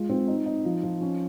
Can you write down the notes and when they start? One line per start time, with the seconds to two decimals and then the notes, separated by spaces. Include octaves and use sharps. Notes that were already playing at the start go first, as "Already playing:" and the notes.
Already playing: G#3 F4
0.09 C4
0.28 D#4
0.46 D#4
0.65 F3
0.83 F3
1.01 C#4